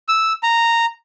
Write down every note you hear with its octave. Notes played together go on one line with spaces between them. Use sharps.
E6
A#5